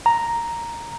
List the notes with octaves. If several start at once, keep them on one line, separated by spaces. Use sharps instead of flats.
A#5